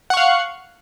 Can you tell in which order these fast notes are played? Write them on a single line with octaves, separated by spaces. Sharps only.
F#5 C#6 F5